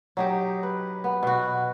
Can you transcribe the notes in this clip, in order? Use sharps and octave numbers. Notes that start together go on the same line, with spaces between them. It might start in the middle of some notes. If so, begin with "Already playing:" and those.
F#3 D#4 G4
B4
B3
B2 F#4